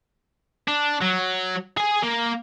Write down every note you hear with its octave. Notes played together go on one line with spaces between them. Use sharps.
D4
F#3
G#4 G#5
A#3